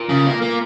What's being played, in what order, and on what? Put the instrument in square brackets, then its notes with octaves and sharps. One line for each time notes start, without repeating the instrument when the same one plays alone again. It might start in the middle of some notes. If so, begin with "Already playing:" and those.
Already playing: [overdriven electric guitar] A#2
[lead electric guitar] C#3
A#3
A#3